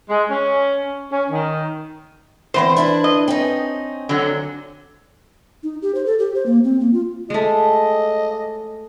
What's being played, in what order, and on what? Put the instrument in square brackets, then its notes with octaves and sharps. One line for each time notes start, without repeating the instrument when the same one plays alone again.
[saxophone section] G#3
C#4
C#4
D#3
[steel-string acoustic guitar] E2 B3 C4 [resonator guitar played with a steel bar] E3 C5
[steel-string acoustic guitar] D4 E4 B4
[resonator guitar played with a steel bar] D#5
[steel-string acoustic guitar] C4 C#4 D#4
[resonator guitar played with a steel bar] D3 F#3
[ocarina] D#4
G4
C5
A4
G4
C5
A#3
C4
A#3
F4
[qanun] G#3 A3 [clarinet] D#5